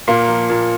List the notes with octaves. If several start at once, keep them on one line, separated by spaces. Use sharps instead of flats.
A#2 A#3
F3
A#2